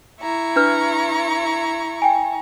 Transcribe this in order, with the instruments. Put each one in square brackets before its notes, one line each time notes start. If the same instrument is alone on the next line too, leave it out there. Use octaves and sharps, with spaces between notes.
[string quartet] E4 A#5 C#6
[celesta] D4 B4 F6
G5 G#5